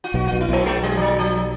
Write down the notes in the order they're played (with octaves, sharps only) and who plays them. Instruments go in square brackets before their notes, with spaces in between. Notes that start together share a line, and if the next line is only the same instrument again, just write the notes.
[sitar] F4
[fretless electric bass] B1 B2 [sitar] F#4
[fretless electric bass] B1 B2 [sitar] F4
[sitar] E4
[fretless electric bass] B1 B2 [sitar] A#3
[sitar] G#3
G3
F3
F#3
F3